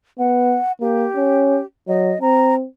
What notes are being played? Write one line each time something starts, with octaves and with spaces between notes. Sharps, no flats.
B3 F#5
A#3 G4
C#4
F#3 D#5
C4 A#5